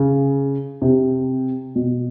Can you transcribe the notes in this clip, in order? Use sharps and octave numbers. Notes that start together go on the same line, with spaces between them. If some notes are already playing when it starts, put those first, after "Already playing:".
Already playing: C#3
C3
B2